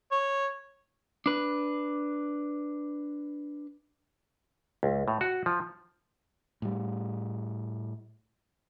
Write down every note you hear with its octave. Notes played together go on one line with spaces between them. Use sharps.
C#5
D4 B4
C#2
A2
F#4
F3
A2 G3